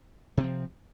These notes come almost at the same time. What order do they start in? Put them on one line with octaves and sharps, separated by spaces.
C3 C4 F3